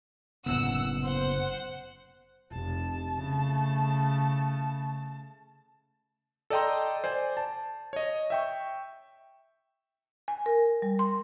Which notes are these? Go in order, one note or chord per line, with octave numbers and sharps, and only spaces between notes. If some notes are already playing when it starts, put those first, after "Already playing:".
F#1 A2 C3 B3 F#5 E6
C5 F#5
F1 A5
C#3 A3
A4 D5 D#5 G5 A#5 C6
C5 D5 G#5
A5
C#5 D#5
E5 G5 C#6
G#5
A#4
G3
C6